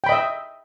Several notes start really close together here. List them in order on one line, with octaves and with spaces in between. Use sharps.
G5 B5 D#5 E5